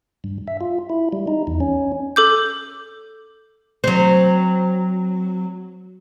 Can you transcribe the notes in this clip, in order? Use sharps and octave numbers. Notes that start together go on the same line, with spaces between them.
G2
E5
F4
E4
G3
D#4
E2
C#4
A4 D6 G6
F#3 C4